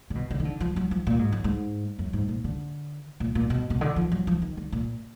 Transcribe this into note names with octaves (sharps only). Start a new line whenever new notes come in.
D3
B2
D3
D#3
D3
F3
F#3
F3
A#2
G#2
F#2
G#2
F#2
G#2
A#2
D3
A#2
A#2
B2
B2
D3
F3
F#3
F3
D#3
D3
A#2